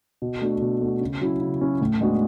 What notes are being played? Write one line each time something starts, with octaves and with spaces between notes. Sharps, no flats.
B2
A3 D4 F#4
B2
A3 D4 F#4
C#3
F#3 C#4 E4
C#3
F#3 C#4 E4
A2
G#3 B3 D4 F#4